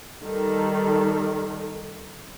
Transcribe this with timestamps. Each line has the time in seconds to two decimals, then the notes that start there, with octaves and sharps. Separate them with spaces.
0.23 D#3 G3 A4